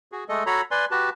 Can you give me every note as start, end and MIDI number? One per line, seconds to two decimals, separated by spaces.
0.12 0.24 66
0.12 0.24 68
0.29 0.44 56
0.29 0.44 57
0.29 0.44 69
0.29 0.44 75
0.46 0.61 66
0.46 0.61 69
0.46 0.61 73
0.46 0.61 82
0.46 0.61 83
0.71 0.85 71
0.71 0.85 74
0.71 0.85 80
0.71 0.85 84
0.91 1.10 66
0.91 1.10 67
0.91 1.10 71
0.91 1.10 81